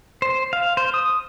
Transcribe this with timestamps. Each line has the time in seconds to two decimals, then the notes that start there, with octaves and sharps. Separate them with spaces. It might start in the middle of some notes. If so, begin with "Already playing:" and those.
0.22 C5
0.53 F5
0.77 C5
0.94 D#6